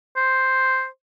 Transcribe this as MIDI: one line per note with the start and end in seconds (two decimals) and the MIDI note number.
0.16 0.86 72